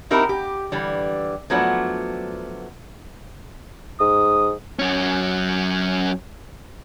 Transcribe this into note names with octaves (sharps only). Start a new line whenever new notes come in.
C4 D#4 E4 G4 A#4
G4
D3 E3 G3
F3 F#3 A3 B3 D4
G#2 D#6
F#2 C#4